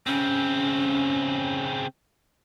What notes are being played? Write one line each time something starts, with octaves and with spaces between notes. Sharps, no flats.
C#3 C4 C#4